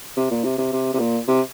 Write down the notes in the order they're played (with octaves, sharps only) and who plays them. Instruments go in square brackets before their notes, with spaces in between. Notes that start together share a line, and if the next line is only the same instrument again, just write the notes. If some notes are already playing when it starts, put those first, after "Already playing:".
[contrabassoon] C3
A#2
C3
C3
C3
C3
A#2
C3